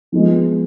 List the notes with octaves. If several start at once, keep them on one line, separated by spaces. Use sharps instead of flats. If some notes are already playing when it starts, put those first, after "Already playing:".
F3 G#3 B3